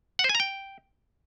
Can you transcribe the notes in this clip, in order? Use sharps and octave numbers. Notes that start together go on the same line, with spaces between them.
F#5
C5
G#5
A#5
G5